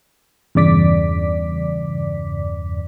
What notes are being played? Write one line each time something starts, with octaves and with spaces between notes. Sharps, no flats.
E2 G2 C#3 D5 D6 B6